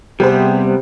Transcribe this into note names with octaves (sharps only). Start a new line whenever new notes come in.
C3 G3 B3 G4 G#4 C5